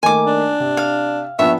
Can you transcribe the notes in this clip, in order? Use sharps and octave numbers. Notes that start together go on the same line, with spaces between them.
D#3 A3 A#3 G#5 D6
D4
C3
F5
A#1 B3 D4 C#5 E5